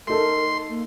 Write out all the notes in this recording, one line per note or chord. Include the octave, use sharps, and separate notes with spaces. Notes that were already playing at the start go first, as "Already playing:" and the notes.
A3 D#4 A4 A#4 C6
A#3